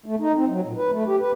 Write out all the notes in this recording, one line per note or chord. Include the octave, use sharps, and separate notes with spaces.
A3
D#4
C4
F#3
A#2
B4
A3
G4
B4